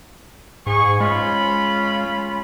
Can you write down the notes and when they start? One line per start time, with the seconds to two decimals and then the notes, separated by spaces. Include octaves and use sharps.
0.67 G#2 G#4 C#6
1.00 G#3 C#4 F4 B5